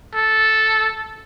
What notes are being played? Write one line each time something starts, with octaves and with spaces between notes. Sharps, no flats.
A4